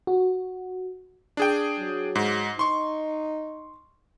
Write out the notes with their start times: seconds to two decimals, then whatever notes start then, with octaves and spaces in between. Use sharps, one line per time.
0.07 F#4
1.37 D4 G#4 G5
1.78 F#3
2.15 G#2
2.59 D#4 C6 C#6